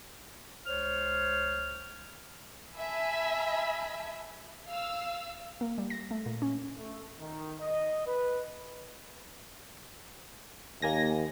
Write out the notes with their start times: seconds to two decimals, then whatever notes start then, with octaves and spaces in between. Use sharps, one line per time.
0.64 C#2 C5 C#5 F6
2.74 E5 G#5 A5 B5
4.69 F5 E6
5.61 A#3
5.78 G3
5.90 A#6
6.11 A3
6.26 A#2
6.42 C#4
6.77 A3
7.19 D#3
7.60 D#5
8.07 B4
10.82 D#2 A#3 G#5 A#6